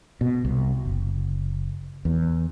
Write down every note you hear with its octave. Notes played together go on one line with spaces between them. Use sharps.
B2
C2
F#1
E2